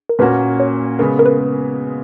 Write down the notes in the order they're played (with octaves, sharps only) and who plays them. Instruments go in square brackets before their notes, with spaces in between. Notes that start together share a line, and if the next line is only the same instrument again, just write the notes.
[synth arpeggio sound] A#4
[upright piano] A#2 A#3 C#4 F#4 [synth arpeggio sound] B4
[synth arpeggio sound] C#5
[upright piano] C#3 G#3 B3 [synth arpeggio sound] A#4
[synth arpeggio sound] A#4
B4